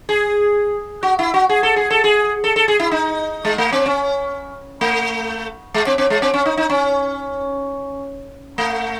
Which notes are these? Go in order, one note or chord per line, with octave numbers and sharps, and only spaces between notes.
G#4
F#4
E4
F#4
G#4
A4
G#4
A4
G#4
A4
A4
G#4
E4
D#4
G#3
A3
C4
C#4
A3
G#3
C4
C4
G#3
C4
C#4
D#4
D#4
C#4
A3